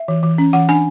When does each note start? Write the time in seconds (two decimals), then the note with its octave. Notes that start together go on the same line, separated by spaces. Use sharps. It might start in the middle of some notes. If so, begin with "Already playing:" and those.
Already playing: E5
0.08 E3
0.23 E3
0.38 C#4
0.53 E3 F#5
0.69 D4 G#5